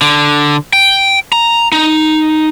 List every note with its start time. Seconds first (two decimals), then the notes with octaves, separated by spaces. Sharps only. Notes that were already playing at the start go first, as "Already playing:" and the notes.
0.01 D3
0.73 G5
1.32 A#5
1.72 D#4